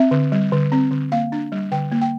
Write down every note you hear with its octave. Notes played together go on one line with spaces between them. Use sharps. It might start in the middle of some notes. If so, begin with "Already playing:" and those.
Already playing: C4 E5
D3
G3
D3
C4
D3
A#3 F5
D4
G3
D3 G5
A#3
G5